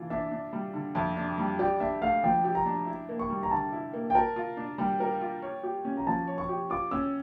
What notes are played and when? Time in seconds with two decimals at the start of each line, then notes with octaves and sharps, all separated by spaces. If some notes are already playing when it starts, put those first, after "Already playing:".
Already playing: E3 D4 F4
0.10 D4 E5
0.31 D4
0.53 G3
0.74 D3
0.95 F2 E5
1.17 D4
1.38 G3
1.59 G4 D5
1.80 D4 E5
2.02 A3 F5
2.24 F3 G5
2.44 G4
2.55 A#5
2.66 D4
2.86 E4
3.09 A#3
3.19 C#6
3.30 G3
3.43 A#5
3.51 D3 A5
3.72 E4
3.93 A#3
4.10 G5
4.15 A#4 A5
4.36 F4
4.57 D4
4.78 G3 G5
5.00 A#4
5.21 F4
5.42 C#5
5.63 G4
5.85 C#4
5.97 A#5
6.07 F3 A5
6.27 C#5
6.38 C#6
6.49 G4
6.70 F4 D6
6.91 C#4 E6